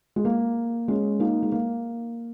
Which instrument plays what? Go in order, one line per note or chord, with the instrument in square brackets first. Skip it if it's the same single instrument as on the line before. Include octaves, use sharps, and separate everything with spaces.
[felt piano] G#3
A#3
G#3 C#4
A#3 D#4
G#3
A#3